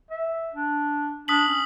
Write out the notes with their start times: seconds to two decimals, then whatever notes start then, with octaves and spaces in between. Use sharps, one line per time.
0.11 E5
0.54 D4
1.28 D4 D#6 B6 F#7
1.48 C#4